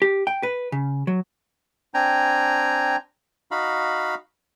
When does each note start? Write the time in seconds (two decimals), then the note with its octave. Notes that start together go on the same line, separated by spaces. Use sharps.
0.02 G4
0.27 G5
0.43 B4
0.72 C#3
1.07 F#3
1.94 C4 D4 G5 G#5 A#5
3.51 D#4 F#4 F5 B5